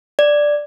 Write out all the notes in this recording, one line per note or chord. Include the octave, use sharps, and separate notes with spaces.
D5